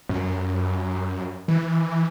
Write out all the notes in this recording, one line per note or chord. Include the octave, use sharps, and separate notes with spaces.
F#2
E3